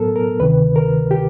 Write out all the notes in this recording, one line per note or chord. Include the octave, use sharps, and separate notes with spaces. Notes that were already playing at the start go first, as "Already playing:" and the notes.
Already playing: A2 F#3 B3 A4 A#4
A#4
D2 C3 D#3 B4
A#4
G4